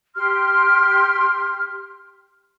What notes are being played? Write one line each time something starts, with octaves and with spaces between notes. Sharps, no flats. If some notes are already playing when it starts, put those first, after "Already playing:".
G4 C6 F6